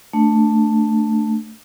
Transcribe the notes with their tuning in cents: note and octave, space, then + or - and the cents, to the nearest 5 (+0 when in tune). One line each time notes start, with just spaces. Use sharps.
A3 +5 D4 +5